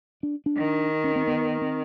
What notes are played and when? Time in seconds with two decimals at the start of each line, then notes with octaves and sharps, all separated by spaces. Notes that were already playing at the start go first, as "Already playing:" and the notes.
0.23 D4
0.46 D4
0.57 D#3
1.04 C#4
1.16 C4
1.27 B3
1.62 C4